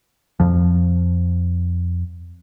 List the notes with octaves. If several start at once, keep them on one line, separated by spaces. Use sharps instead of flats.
F2 F3